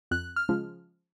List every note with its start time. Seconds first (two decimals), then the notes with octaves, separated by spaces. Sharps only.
0.11 F2 F#6
0.36 F6
0.49 C#3 F3 G#3